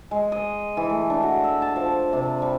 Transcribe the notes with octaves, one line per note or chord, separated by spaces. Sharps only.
G#3
D#5
E3
A3
D4
F#4
E5
A5
F3
C3
G3